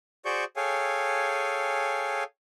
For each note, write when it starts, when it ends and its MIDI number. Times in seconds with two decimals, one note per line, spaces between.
0.25 0.44 66
0.25 0.44 68
0.25 0.44 72
0.25 0.44 74
0.25 0.44 85
0.25 0.44 91
0.56 2.23 68
0.56 2.23 69
0.56 2.23 73
0.56 2.23 77
0.56 2.23 79
0.56 2.23 80